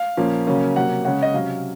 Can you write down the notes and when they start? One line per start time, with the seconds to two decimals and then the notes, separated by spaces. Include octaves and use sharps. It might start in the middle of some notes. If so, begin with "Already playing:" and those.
Already playing: F5
0.17 A#2 F3 A#3 C#4
0.47 C#3 F#3 A#3 C#4
0.75 C3 F#3 A#3 F#5
1.05 C#3 G#3 C#4 F#5
1.22 D#5
1.34 C3 F#3 C#4 F5